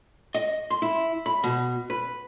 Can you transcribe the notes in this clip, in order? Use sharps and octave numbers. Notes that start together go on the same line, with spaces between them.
D#5
C6
E4
B5
B2
B4